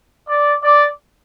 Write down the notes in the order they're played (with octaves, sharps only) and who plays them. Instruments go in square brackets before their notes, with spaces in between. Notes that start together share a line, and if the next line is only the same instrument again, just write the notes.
[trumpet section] D5
D5